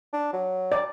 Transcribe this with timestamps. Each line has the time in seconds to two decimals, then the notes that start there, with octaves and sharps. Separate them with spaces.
0.13 D4
0.33 F#3
0.72 D5